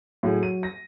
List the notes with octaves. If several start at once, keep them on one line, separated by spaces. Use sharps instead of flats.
A2 F#3 F#4 G#4
D#7
A#6